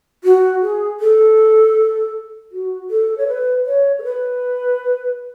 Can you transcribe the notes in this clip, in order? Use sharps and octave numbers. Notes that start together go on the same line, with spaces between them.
F#4
G#4
A4
F#4
A4
C#5
B4
C#5
A4
B4